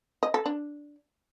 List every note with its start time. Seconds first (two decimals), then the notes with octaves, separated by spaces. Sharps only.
0.23 D#5
0.34 A4
0.46 D4